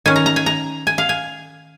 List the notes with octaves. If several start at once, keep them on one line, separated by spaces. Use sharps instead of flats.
D#3 C#4 G#5
A#5
A#5
G#5
A#5
G#5
F5
G#5